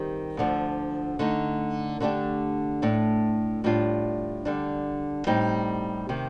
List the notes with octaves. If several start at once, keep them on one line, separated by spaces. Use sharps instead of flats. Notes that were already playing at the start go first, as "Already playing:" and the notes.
Already playing: D#3 G3 C4 G4
D2 D3 F3
D3 A3 D#4
D3 A3 D4 G4
A2 A3 D4
A2 G3 D4 F4
D3 G3 D4
A2 G3 C4 D#4 G4
C3 D#3